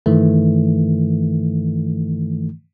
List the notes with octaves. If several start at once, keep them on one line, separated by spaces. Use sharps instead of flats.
G2 D#3 E3 A3